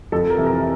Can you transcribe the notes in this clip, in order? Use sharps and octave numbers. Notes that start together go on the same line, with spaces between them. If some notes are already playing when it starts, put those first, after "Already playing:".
F2 A4
A#4
C3 E3
A#4